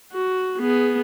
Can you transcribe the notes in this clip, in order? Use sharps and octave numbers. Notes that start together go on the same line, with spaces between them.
F#4
B3 G#4